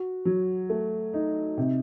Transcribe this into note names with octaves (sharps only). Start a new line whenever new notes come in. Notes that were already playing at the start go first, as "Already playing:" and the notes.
Already playing: F#4
F#3
A3
D#4
C3